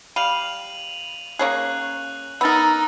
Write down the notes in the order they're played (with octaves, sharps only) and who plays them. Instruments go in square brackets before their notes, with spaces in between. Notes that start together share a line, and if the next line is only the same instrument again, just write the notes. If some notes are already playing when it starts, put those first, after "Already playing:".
[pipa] G3 F5 [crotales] D#7 F7 F#7
[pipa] A#3 C#4 G#4 [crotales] F#6
[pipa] B3 A#4 [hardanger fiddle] D#4 [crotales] E6 A6